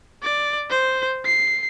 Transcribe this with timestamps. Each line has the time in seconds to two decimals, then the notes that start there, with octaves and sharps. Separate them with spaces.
0.22 D5
0.70 C5
1.26 C7